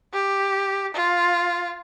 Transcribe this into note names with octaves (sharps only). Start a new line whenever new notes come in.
G4
F4